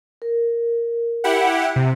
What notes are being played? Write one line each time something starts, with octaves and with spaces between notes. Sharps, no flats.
A#4
E4 G4 F#5
C3